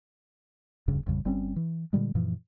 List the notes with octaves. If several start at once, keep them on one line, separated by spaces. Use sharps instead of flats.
E1 D2 G2 C#3
A1 F2 C#3 G3
G1 G3 C4 C#4
E3
A#2 D3 G3 G#3
F#2 A#2 E3 F3